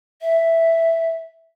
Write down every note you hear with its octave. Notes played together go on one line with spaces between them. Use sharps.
E5